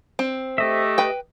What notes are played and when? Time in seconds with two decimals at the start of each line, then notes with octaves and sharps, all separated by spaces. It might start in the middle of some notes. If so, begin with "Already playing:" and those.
0.19 C4
0.58 A3 G4 D#5 E5
0.98 B4 G5